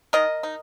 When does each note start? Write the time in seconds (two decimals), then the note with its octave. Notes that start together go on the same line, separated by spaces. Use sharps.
0.13 D#3 A#4 D#5
0.43 D#4